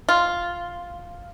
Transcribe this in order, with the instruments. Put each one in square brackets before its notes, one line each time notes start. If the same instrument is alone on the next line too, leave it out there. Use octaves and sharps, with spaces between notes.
[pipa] F4